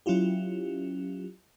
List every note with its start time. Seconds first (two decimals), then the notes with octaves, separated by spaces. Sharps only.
0.06 F#3 C#4 E4 F4 G4